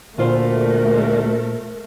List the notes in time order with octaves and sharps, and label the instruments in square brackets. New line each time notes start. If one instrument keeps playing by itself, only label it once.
[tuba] D2 [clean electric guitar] A#2 F4 C5 [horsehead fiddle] A3 A#4